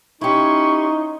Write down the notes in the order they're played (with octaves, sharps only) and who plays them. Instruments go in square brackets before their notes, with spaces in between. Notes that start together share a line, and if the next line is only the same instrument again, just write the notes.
[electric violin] C#4 C6 [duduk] D#4 [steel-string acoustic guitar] E4 G4 [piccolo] C#6